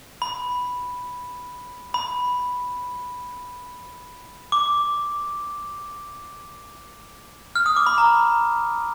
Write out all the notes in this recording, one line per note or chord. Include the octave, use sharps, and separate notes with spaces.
B5
B5
D6
F6
D#6
D6
B5
A#5